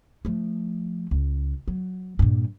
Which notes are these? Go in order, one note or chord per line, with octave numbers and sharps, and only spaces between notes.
F3 A3
C#2
F#3
G2 A#2